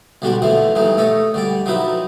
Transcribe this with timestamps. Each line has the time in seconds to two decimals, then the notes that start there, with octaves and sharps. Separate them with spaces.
0.22 B1 D3 G3 D4 F#4 C6
0.42 D3 E3 F3 A3
0.75 G2 E3 A3 D#4
0.97 A3 A4 C#5 D#5
1.34 D3 G3 D5
1.66 F3 F#3 D#4 E4 B4